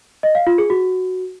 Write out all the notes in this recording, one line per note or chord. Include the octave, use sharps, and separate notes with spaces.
D#5
F5
F4
G#4
F#4